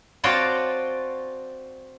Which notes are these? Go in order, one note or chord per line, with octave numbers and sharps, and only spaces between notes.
C4 F4 F#4 C#5 D5 A5